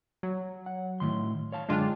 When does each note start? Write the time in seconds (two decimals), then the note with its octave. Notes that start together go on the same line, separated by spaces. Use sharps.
0.23 F#3
0.66 F#5
1.00 A2 D#3 C6
1.52 C#5 F5 A5
1.69 F#2 D3 G#3 D4 F4 G5